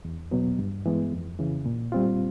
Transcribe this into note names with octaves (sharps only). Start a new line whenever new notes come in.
E2
B2 F#3 B3
G2
E3 G#3 B3
F2
C#3 E3
A#2
G3 C4 F4